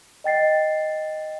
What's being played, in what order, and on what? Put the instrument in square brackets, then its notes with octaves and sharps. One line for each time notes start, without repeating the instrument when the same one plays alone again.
[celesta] D#5 G5 A6 C7